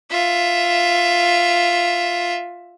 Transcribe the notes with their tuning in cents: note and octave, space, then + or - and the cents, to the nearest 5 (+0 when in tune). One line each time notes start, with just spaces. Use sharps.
F4 +0 E5 +10